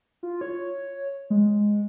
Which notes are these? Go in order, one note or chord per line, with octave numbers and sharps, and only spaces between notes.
F4
C#5
G#3